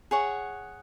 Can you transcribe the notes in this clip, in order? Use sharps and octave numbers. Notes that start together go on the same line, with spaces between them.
G#4 C#5 F#5 C#6